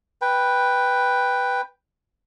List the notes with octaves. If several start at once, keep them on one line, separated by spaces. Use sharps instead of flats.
B4 G5